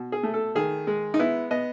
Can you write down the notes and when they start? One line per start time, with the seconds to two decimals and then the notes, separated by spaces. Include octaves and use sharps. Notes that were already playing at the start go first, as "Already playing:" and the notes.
Already playing: B2
0.12 G#4
0.23 A3
0.34 A4
0.55 D#3 G#4
0.87 G#3
1.14 D#4
1.19 B3 E4
1.51 B3 D#5